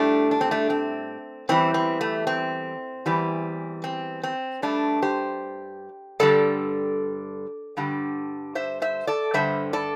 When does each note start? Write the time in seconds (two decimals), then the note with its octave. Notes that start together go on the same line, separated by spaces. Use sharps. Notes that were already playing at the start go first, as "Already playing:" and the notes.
Already playing: A2 G3 A3 D4
0.31 D4
0.41 C4
0.51 A3 D4
0.70 C4
1.49 E2 E3 G3 C4
1.74 C4
2.01 A3
2.27 C4
3.06 E2 E3 G3
3.84 C4
4.23 C4
4.62 G2 G3 A3 D4
5.02 G4 C5
6.20 G2 D3 G3 A4 D5
7.77 G2 D3 G3
8.55 C5 E5
8.82 C5 E5
9.07 A4 D5
9.34 G2 D3 G3 C5 E5
9.73 A4 D5